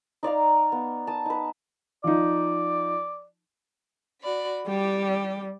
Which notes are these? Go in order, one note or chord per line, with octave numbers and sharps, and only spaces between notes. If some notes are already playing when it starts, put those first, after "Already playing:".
D#4 D5 F5 A#5
B3
A5 D#6
D#4 B4
F3 D#4 D5
F#4 D5 B5
G3 G4